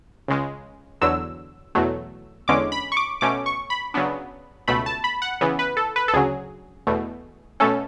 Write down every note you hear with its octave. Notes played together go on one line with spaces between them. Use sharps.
C#2 C#3 G#3
E2 D3 F#3 E6
E2 B2 F#3 A3
E2 D3 G#3 C#4 D6
B5
C#6
D6
B2 A3 C#4 D6
C#6
B5
C#3 F#3 B3 D4
C#2 B2 A3 B5
A5
B5
F#5
C#3 E3 B3
B4
A4
B4
A4
D2 C#3 F#3 G#4
E2 B2 A3
B2 A3 C#4 A4